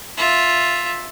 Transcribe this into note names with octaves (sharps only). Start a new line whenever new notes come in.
F4 E5